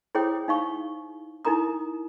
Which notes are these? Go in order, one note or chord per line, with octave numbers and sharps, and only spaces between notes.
E4 G#4 C5 C#5 G5 D#6
D#4 F5 C#6
D#4 E4 A#4 A#5 D#6